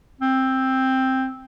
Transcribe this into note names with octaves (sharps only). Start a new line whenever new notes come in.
C4